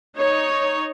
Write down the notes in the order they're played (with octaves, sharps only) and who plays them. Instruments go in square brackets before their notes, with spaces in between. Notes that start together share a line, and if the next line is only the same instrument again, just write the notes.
[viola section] D#4 C#5